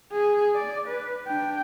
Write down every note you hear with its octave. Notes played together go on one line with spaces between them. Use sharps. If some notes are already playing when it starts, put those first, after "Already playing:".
G#4
D5
B4
D4 G5